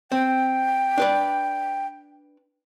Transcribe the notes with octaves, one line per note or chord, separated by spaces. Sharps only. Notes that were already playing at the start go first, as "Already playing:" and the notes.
C4 G5
D4 B4 D5